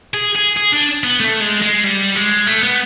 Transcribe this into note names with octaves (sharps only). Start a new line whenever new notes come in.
G#4
G#4
G#4
D4
B3
A3
G#3
G#3
G3
G#3
A3
B3